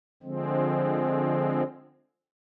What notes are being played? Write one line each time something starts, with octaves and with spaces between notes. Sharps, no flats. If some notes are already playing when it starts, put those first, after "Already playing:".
D3 F3 G#3 C4